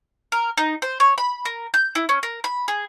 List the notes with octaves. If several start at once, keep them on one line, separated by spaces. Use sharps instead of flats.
A#4
D#4
C5
C#5
B5
A#4
G6
E4
C#4
A#4
B5
G#4